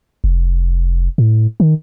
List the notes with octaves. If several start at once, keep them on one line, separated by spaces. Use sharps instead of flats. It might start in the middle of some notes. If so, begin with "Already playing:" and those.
F1
A2
D#3